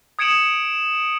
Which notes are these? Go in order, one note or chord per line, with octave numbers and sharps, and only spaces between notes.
D#6 G#6 C#7 D7 E7 F#7